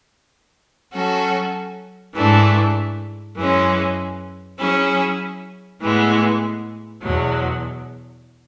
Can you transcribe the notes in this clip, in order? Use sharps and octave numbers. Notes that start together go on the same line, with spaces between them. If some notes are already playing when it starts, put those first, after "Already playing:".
F#3 C#4 F#4 A4
G#2 E3 A3 D4
F#2 E3 G#3 C#4
F#3 C#4 E4 G#4
A2 E3 G#3 B3
E2 B2 F#3